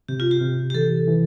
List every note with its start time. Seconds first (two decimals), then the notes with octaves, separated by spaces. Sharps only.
0.08 C3 G4
0.20 F4
0.31 G4
0.41 C3
0.70 G4
0.74 E3 A4
1.08 E3